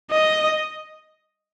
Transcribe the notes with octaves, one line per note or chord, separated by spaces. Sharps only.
D#5